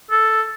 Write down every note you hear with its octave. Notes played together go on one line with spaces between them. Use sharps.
A4